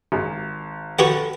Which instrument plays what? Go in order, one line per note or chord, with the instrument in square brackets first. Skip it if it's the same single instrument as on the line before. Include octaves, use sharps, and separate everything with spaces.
[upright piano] G#1
[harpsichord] F#4 G4 F#5 [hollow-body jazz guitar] A4 B4